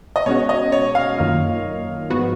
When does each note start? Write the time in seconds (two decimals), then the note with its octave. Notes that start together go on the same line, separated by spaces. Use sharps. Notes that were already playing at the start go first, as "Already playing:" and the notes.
0.16 D#5
0.26 B2 G#3 C#4 F#4 C#5
0.49 D#5
0.72 C#5
0.95 F5
1.18 F#2 D#3 A#3 F4
2.10 G#2 F3 B3 F#4